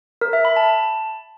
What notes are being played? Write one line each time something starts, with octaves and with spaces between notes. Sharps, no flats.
A#4
E5
B5
A5